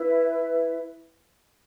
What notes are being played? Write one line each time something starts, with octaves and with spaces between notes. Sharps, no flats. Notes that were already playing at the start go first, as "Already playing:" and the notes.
Already playing: E4 B4 E5